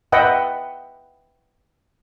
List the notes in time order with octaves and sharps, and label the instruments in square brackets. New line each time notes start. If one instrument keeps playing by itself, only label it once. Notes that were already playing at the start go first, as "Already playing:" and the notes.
[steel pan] B4 D#5 E5 F#5 G5